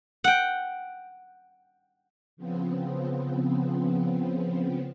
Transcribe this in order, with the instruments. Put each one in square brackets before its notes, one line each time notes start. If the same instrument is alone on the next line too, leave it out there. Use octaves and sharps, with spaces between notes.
[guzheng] F#5 G5
[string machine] C#3 F3 B3 C4